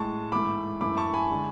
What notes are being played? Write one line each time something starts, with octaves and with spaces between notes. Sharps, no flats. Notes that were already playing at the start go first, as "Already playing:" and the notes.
Already playing: A2 G#3 A5 C#6
G#2 E3 A3 B5 D6
F#2 E3 A3 B5 D6
A5 C#6
G#5 B5
D3 G#3